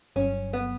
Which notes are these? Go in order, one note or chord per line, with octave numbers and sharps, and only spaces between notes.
G1 G2 F#3 C#4
B3